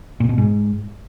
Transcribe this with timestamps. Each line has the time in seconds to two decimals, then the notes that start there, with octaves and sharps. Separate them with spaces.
0.20 A#2
0.29 B2
0.38 G#2